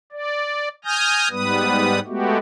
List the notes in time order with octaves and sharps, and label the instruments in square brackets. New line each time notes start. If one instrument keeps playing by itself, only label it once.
[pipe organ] D5
G#5 D#6 F6 G6 A#6
G#2 G3 B3 B4 D#6
G#3 A3 B3 F#4 G4